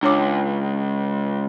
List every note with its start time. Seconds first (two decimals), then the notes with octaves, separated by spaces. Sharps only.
0.03 C#2 D4 C#5 D6